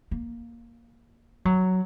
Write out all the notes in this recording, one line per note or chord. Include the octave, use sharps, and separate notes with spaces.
A#3
F#3